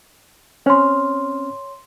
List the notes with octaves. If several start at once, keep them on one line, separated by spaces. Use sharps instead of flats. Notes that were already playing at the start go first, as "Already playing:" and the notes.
C4 C#4 C#5 C6 F6